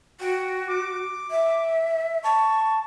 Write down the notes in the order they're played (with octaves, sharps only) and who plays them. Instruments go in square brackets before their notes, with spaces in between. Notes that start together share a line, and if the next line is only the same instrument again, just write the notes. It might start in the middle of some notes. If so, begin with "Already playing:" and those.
[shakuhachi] F#4 [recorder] G5
[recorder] D6
[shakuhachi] E5
[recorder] A5 [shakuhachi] C#6